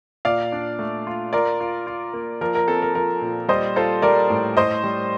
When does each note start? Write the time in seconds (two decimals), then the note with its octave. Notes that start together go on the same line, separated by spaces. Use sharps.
0.25 A#2 D5 F5
0.52 D4
0.79 A3
1.07 F4
1.33 F4 A#4 D5
1.60 F4
1.87 F4
2.14 A#3
2.41 F3 A#4
2.55 A#4
2.68 C4 A4
2.82 A#4
2.95 F3 A#4
3.21 A#2
3.48 G3 C5 D#5
3.76 F4 A4 C5
4.02 G3 A#4 D5
4.30 A2
4.57 A2 C5 D#5
4.83 G3